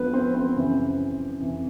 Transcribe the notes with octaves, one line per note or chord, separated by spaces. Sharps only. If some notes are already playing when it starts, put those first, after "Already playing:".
Already playing: F2 D3 F3 B3 B4
C4 C5
C4 C5
F#2 C#3 E3
F2 C3 E3